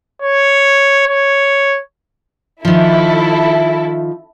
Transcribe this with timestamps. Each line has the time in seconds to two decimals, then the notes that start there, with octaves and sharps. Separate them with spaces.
0.22 C#5
1.07 C#5
2.65 D#3 F3 E4 A4